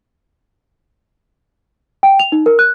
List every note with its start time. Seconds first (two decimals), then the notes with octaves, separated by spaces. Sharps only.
2.03 G5
2.19 F7
2.32 D#4
2.46 A#4
2.59 F#6